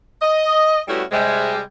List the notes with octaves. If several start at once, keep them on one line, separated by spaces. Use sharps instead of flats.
D#5
G3 A3 B3 C#4 E4 F#4
C3 G3 G#3